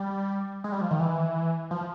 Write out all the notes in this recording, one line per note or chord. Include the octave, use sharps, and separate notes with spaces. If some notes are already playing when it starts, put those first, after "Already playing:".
Already playing: G3
G#3
G3
F3
D#3
E3
F3